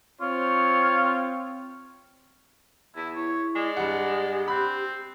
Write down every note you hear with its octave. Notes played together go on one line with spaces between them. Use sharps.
C4 F4 C#5
E2 E4
E4 C#5
G#3 D5
G2 G4 F#5
C4 B5 F#6